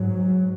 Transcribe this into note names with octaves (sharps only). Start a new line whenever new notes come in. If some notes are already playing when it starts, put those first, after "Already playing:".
Already playing: G#2 F#3